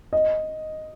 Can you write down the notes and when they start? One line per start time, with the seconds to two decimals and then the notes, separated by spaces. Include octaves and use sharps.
0.13 D#5